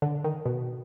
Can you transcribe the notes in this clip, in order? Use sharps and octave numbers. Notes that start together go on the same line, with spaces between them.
D3
D#3
B2